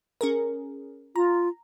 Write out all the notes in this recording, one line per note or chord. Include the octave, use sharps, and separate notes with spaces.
C#4 G#4 A#4
F4 A#5